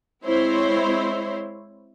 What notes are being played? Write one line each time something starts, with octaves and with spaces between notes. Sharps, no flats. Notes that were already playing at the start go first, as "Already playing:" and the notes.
G#3 C4 E4 C5 C#5